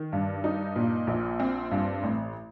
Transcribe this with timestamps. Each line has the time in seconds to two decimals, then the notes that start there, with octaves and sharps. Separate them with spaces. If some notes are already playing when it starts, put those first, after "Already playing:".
Already playing: D#3
0.13 G2
0.44 D#4
0.76 A#2
1.07 A#1
1.40 C4
1.71 G2
2.03 A1